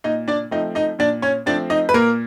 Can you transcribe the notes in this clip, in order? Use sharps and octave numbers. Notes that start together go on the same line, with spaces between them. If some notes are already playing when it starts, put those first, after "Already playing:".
A#2 D#4 D#5
D4 D5
F3 A3 C4 D#4 D#5
D#4 D#5
A#2 D4 D5
C#4 C#5
F3 A3 C4 D4 D5
D#4 D#5
B4
A#2 A#3 A#4